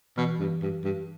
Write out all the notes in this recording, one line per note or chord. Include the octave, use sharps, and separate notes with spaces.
B2 E3
G2
G2
G2